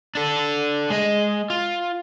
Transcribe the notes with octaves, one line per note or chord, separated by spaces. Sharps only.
D4 A4
G#3 D#5
F4